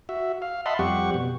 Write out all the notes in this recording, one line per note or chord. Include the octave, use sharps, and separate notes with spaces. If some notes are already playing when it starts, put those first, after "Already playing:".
F#4 E5
F5
D#5 E5 F#5 A5 B5 C6
F2 G3 C4 G4 F#5 C#6
B2